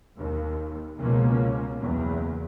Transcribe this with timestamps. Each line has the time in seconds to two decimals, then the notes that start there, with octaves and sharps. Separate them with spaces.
0.17 D#2
0.98 C#2 B2 F3 A#3 C#4
1.80 F#1 E2